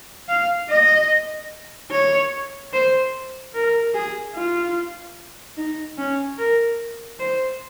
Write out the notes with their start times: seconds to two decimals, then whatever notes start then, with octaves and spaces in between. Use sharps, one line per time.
0.29 F5
0.69 D#5
1.91 C#5
2.73 C5
3.54 A#4
3.94 G#4
4.35 F4
5.57 D#4
5.98 C#4
6.38 A#4
7.19 C5